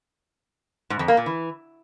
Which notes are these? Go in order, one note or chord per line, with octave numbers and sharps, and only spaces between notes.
G#2
F2
A#3
A#2
E3